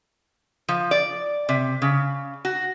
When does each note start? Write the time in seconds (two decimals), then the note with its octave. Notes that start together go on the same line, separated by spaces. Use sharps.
0.69 F3
0.91 D5
1.49 C3
1.82 C#3
2.45 F#4